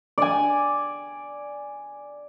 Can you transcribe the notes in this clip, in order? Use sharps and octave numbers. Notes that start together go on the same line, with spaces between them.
D5 G#5